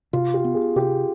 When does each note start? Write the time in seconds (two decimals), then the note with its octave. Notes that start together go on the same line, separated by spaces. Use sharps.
0.13 C3 F4
0.34 G4
0.44 B3
0.54 G#4
0.76 C3 G4